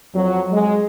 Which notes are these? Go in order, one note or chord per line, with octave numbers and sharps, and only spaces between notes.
F2 F#3
G#3